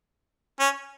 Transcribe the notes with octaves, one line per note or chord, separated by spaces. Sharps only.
C#4